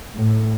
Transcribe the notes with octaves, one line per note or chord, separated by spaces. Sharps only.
A2